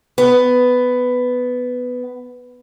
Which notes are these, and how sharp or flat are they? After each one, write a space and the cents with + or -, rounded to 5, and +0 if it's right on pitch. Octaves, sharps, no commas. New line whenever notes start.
B3 +10